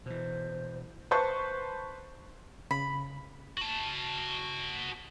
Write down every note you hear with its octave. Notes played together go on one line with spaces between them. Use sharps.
B2 E3 C5
B4 C5 A5 C#6
C#3 B5
F#4 A5